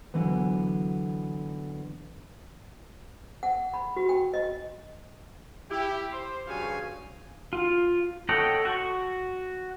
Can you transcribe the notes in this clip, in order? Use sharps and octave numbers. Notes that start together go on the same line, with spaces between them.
D3 E3 F#3 B3
F#5
B5
F#4
G5
D#5
E4 G4
C5
G2 C#3 F3 F#4 F5 G#5
F4
A4 C#5 D#5 F#5 G5
F#4 C#6